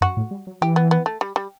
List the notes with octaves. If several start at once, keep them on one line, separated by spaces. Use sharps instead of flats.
F#2 F#4
A2
G3
F#3
E3 G4
B3
B3
A3
G3
G3